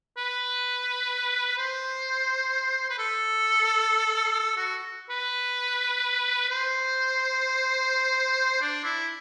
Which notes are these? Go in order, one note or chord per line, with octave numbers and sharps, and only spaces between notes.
B4
C5
B4
A4
A4
F#4
B4
C5
D4
E4